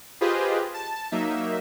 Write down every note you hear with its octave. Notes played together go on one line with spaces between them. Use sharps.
F4 G4 G#4 B4 C5 D#5
A5
F#3 A#3 D#4 E5